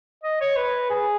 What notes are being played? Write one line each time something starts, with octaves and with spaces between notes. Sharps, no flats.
D#5
C#5
B4
G#4